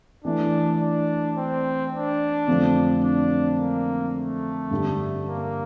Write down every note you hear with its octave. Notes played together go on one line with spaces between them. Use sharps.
E3 A3 D4 E4
D4
C4
D4
F2 D3 A3 C4 F4
D4
A#3
A3
G2 D3 G3
A#3